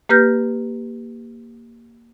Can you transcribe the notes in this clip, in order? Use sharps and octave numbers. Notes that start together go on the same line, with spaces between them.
A#3 G4 B4 F6 G6 A#6